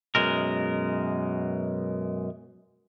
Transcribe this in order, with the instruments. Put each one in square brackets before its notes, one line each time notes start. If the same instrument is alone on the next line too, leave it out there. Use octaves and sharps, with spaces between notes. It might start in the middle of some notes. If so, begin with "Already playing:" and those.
[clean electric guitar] F#2 B2 G#3 A#4